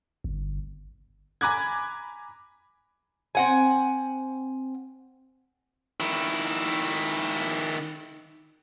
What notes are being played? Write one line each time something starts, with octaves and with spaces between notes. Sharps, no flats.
G1
G#5 A#5 B5 D6 F#6 G#6
C4 F#5 G#5
D#3 E4